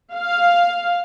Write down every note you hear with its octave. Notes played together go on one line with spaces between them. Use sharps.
F5